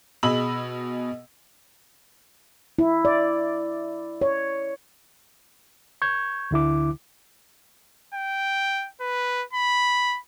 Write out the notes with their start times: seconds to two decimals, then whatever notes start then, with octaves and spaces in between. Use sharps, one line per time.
0.23 B2 G#4 D#5 B5 E6 F#7
2.79 E4
3.05 D5
4.21 C#5
6.02 C#6 G6 G#6
6.51 D2 D3 E4 D6
8.14 G5
9.00 B4
9.53 B5